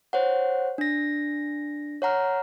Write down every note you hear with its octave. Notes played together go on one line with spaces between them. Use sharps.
C5 C#5 F#5
D4 A#6
C#5 F#5 A#5 F6